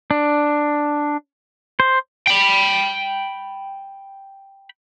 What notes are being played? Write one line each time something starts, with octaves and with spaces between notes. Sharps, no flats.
D4
C5
G5 B5